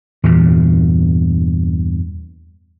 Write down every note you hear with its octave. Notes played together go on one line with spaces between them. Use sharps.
E2 G2 A#2